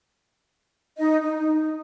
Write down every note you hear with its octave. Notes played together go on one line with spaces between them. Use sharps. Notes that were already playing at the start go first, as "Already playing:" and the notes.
D#4 D#5
D#4